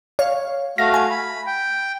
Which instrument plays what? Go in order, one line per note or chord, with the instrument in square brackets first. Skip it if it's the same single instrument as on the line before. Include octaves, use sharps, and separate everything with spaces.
[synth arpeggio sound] C#5 F5
[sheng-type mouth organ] A3 F#4 F5 [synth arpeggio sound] A#6
[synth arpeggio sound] G#5
[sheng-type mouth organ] B5
G5